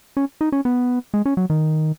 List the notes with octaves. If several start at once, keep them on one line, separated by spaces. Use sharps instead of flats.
C#4
D#4
C#4
B3
G#3
C#4
F#3
D#3